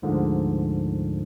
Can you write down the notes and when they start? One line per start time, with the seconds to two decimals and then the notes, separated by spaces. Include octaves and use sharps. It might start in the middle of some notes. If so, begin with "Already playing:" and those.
0.02 D2 G#2 D3 F3 A#3